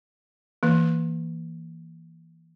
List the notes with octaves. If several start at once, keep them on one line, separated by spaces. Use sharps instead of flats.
E3 A#3